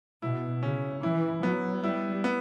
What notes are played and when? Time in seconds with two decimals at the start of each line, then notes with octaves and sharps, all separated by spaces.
0.22 B2 E4
0.63 C#3 C#4
1.03 E3 E4
1.43 F#3 B3
1.84 G3 E4
2.24 B3